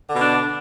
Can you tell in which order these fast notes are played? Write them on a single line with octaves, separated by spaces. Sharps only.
D3 B2 D4